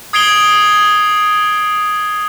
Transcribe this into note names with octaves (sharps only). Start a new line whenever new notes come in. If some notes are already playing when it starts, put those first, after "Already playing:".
D#6 G#6 C7 D7 F7 G7